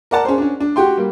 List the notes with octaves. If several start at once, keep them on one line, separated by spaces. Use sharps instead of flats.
A#4 D5 F#5 A5
C#4 G#4 C5
C#4 D4
D4
F#4 G4 G5 C6
G3 A#3